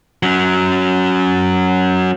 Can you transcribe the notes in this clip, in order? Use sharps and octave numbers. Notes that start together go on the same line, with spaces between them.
F#3 C#4